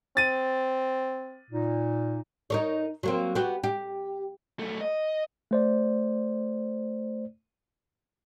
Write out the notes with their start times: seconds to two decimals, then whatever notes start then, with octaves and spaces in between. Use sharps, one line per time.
0.17 C4 A6 D#7
1.50 A#2 D#4
2.50 D#4 A#4 C#5
3.03 F#3 A#3 C4
3.35 B3 F#4 G4
3.64 G4
4.59 F#2 A3
4.81 D#5
5.51 A3 C5 D5